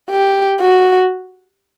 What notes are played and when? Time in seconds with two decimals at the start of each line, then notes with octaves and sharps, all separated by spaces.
0.10 G4
0.61 F#4